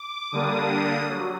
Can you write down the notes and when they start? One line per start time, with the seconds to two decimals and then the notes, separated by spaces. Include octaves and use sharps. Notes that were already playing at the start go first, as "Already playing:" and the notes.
Already playing: D6
0.32 D3 G3 A#3 D4 D#6
1.09 F#3